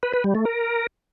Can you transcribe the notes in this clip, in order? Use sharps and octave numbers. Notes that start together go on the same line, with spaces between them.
B4
B4
G3
A3
A#4